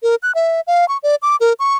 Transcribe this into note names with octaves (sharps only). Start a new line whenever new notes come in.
A#4
F#6
E5
F5
C#6
D5
D6
A#4
C#6